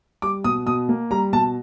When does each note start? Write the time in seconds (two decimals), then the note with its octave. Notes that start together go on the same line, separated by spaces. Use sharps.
0.22 G3 D6
0.44 B2 D#6
0.66 B2 D#6
0.89 A#3
1.11 G3 A#5
1.33 B2 A5